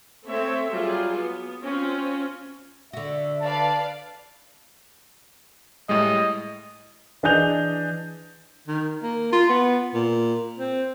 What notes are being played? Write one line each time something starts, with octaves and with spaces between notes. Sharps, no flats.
A3 C4 A4 C#5 E5
F#3 G3 F4 G#4
B3
C4 C#4 F4
D3 F#4 E5
B4 D5 F5 A5
A2 G3 G#3 D#5
E3 D4 G#4 D#5 G6 F7
D#3
A#3
F4
B3
A#2
C4